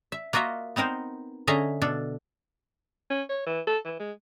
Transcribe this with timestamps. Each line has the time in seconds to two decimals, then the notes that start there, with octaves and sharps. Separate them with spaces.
0.12 E5
0.33 A#3 F4 F#4 D#5 E5
0.76 B3 C4 D#4 A#4 C5
1.47 D3 C#4 G#4 D#5 E5 A#5
1.82 B2 D4 A4
3.10 C#4
3.29 C#5
3.46 E3
3.67 A4
3.85 E3
3.99 G#3